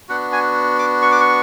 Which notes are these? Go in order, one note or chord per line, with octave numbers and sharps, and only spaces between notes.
B3 D4 F#4 F#5
G#5
D6
C#6
D6
C#6